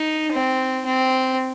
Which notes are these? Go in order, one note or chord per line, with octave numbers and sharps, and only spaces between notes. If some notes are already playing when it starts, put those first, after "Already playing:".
Already playing: D#4
C4
C4